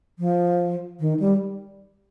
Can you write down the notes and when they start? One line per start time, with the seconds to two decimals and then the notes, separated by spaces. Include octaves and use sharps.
0.19 F3
1.00 D#3
1.20 G3